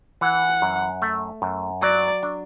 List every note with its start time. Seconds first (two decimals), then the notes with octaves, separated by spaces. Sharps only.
0.21 E3 F#5
0.62 F#2
1.02 A3
1.42 F#2
1.82 F#3 D5
2.23 D4